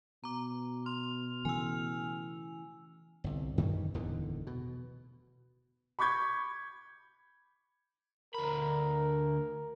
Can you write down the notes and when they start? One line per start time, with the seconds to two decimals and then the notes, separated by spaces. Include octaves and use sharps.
0.24 B2 A#5 D6
0.86 C6 F6
1.45 C#3 E3 A3 G#5 E6
3.24 G1 C2
3.58 F#2 D#3 E3 G3
3.94 D1 E2 D3 D#3
4.47 B2
5.99 B5 C#6 D6 G6 G#6
8.34 D2 A#4 B5